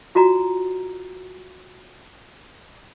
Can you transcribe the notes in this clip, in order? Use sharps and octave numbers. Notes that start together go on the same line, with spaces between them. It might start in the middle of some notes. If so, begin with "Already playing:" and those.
F4 F#4 D5 A#5